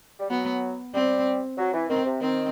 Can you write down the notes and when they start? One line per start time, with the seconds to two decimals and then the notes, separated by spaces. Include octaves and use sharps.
0.20 G3
0.30 F#3 B3
0.94 G3 C4
1.58 F#3
1.74 E3
1.90 D#3 C4
2.05 C3
2.21 D#3 C4